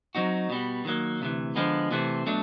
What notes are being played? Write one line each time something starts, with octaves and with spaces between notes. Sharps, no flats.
F#3 A3 C4 D#4 F#4
B2 G3 B3
D#3 F#3 A#3
D2 C3 E3
D3 F3 G#3 B3
C3 E3 A3 C4
B2 F#3 A3 D4